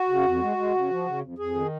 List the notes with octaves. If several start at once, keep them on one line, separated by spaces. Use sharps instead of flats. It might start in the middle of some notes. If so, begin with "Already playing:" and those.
Already playing: F#4
C#3
F2
G#3
G#3
C#3
F3
C#3
F2
F2 G#4
D#3